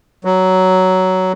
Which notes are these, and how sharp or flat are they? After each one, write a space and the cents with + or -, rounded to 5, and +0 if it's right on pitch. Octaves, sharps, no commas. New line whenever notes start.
F#3 +10